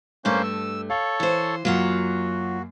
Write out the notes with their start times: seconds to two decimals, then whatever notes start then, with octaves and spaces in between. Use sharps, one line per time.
0.25 G2 A3 A#3 C#4 C5
0.43 E6
0.90 A4 C#5 F5
1.20 E3 C5
1.65 F#2 F#3 A#3 F4 F#4 F#5